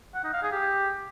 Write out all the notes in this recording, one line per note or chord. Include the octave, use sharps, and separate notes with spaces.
F#5
D#4
F5
G#4
G4